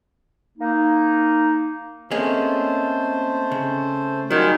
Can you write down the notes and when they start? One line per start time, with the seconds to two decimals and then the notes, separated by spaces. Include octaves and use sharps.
0.58 A#3 D#4
2.11 A3 A#3 C4 C#4 G#4 C5 D#5
3.52 C#3
4.31 D#3 F#3 G3 F4 F#4 G#4 D#5 G#6